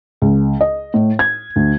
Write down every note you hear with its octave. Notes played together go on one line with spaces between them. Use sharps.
C#2
D#5
A2
G#6
D2